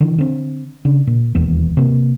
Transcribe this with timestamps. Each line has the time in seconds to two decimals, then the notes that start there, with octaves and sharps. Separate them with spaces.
0.01 D3 E3
0.18 D3 C4
0.85 C#3 D4
1.07 A#2
1.35 E1 D#2 E3 B3
1.77 C3 A#3